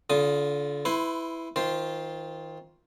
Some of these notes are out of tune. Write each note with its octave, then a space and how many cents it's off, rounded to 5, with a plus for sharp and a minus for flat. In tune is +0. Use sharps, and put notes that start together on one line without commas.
D3 -35 F4 +0 D#6 +0
E4 +0 B4 +25 C6 +15
D#3 +30 F4 +0 C5 +0